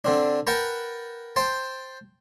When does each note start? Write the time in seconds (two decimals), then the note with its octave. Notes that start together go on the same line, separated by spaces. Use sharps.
0.05 D3 C4 D4
0.47 A#4 B4 F#5 G5 A5 A#5
1.36 C5 G5 A5